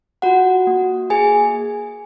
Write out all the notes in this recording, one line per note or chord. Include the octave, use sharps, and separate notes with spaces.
F4 F#4 F#5
A#3
A#3 G#4 G#5